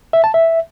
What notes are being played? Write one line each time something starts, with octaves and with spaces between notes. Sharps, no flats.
E5
A5
E5